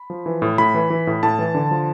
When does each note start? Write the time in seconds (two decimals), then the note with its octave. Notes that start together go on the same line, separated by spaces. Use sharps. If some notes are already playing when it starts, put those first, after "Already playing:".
Already playing: B5
0.10 F3
0.26 E3
0.42 A2
0.58 A2 B5
0.74 E3
0.90 E3
1.07 A2
1.23 A2 A5
1.39 E3
1.55 D3
1.71 F3